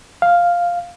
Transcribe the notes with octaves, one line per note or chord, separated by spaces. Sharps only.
F5